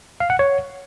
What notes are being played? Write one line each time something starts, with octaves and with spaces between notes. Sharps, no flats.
F5
F#5
C#5